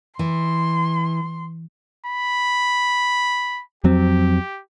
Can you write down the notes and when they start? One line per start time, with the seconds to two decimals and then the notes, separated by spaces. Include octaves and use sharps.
0.19 E3 C6
2.06 B5
3.84 F2 F#3 C4 G4